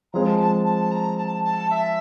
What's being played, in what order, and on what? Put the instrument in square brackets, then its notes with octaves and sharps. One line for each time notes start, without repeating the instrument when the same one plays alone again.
[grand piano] F3 G#3 C4 [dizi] A#5
[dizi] A5
A5
A5
A#5
A5
A5
E5